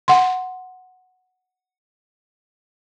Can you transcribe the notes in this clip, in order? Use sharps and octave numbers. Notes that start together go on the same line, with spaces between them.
F#5 C6